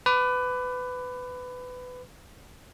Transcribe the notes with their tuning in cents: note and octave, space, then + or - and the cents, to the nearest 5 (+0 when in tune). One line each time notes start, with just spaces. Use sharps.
B4 +20 D6 +0